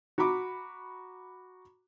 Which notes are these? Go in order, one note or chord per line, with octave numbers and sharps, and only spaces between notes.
F#4 A#5 B5 D6